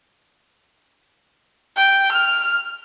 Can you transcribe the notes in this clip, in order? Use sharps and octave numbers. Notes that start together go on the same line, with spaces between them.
G5
F6